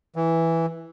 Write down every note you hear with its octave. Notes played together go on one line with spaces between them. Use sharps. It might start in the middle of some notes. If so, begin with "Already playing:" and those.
E3